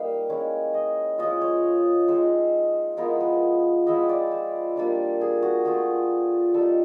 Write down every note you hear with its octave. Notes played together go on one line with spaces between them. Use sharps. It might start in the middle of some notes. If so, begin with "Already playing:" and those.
Already playing: G3 A#3 D#4 F5 G5
G#3 C#4 E4
D#5
F3 G#3 C#4 F4 D#5
C#5
G#3 C4 D#4 C5
F3 G#3 B3 E4 A#4
B4
F3 G#3 C4 E4 D#5
D5
C5
G3 A#3 D4 F4
G#4
F#4
A3 C4 F4 G#4
G3 C4 D#4 A4